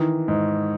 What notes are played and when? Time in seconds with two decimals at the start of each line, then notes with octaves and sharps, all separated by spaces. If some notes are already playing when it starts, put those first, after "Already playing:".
Already playing: D#3 E3
0.28 G#2